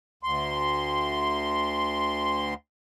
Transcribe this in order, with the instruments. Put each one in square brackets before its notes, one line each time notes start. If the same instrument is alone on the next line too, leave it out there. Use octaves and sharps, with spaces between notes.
[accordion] D2 C6